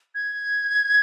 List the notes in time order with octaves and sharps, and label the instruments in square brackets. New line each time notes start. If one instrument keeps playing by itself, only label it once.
[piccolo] G#6